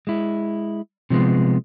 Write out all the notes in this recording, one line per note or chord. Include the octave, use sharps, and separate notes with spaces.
G#3 E4
C3 F3 G#3 B3